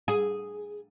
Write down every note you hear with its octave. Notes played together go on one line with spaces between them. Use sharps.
G#4